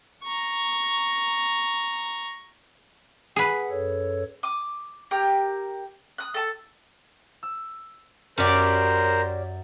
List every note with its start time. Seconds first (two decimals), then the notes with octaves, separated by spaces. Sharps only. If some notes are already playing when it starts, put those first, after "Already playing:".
0.23 A#5 C#6
3.36 G#4 B4 F#5
3.70 F#2 A4 C#5
4.43 D6 D#6
5.11 G4 A#4
6.18 D#6 F#6
6.34 A4 A5
7.43 E6
8.38 F#2 C#4 G4 A#4 C5 D5